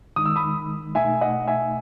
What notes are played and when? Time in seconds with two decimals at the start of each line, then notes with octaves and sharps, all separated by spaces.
0.16 D#3 G#3 D#4 D#6
0.26 E6
0.36 B5 D#6
0.95 B2 A3 D#4 E5 G#5
1.21 D#5 F#5
1.47 E5 G#5